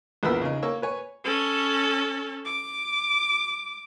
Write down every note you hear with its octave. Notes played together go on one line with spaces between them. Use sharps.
A#1 E2 B3 A#4 B5 E6
C#3 D#4
A#3 C#5 E6
B4 C#5 G#5
C#4 A4
D6